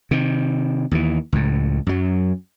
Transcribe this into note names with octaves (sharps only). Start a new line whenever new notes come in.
C3 D#3
D#2 E3
C#2 A2
F#2 F#3